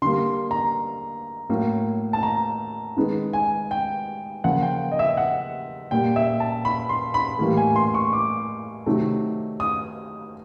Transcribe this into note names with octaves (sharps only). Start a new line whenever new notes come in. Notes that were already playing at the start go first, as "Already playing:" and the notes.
D3 G3 A#3 C6
A#5
A2 F#3 A#3
A5
A#5
D#3 G#3 B3
G#5
G5
C#3 F3 A#3 F#5
G5
D#5
E5
F#5
A#2 G3 A#3 G5
E5
A5
B5
C6
B5
A2 E3 G3 A#3
G#5
C6
C#6
D6
C3 D#3 F#3 A3
D#6